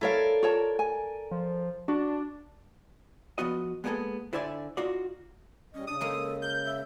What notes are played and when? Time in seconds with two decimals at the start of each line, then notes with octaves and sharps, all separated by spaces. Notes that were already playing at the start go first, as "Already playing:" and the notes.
0.01 E4 A4 A#4 C#5 D5 F5
0.43 F4 C#5 A5
0.79 G#5
1.31 F3
1.88 D4 F#4
3.38 F3 B3 F#4 D#5
3.84 G#3 A#3 B3 F#4 G#4 A4
4.33 D3 E4 C5 D5 E5 G#5
4.77 D#4 F4 F#4 D5
5.74 E2 G3 C#4 D#5
5.87 C#3 D4 D#6
6.01 G#3 A#3 A4 D#5
6.42 A#4 G6
6.64 E5